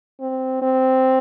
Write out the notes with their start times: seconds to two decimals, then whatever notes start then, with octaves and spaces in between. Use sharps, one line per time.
0.20 C4
0.62 C4